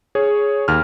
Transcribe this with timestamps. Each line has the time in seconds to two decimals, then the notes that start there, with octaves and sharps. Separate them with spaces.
0.15 G#4 C#5
0.68 D#2 F6